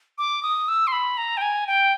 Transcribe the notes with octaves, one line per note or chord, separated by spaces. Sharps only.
D6
D#6
E6
C6
B5
A#5
G5
G#5
G5